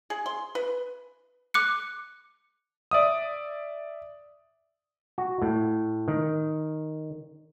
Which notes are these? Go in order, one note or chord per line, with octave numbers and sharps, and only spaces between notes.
G#4
C6
B4
D6 F#6 C#7
D5 E5 D#6
F#4
A2
D#3